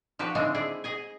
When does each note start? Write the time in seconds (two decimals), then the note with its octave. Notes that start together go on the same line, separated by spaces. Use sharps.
0.19 F3 F#4 G4 B4
0.35 A2 D3 D#3 G#3 C4 D4
0.55 E4 G#4 D5
0.84 G#4 D#5 G#5